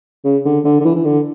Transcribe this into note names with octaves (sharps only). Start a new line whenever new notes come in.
C#3
D3
D3
D3
E3
E3
D3